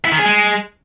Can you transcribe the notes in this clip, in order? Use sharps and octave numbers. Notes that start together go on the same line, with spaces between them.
E4
D#3
G#4
G#3